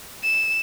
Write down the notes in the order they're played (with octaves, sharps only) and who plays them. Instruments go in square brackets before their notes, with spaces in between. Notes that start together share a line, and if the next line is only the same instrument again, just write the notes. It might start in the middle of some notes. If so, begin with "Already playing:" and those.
[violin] E7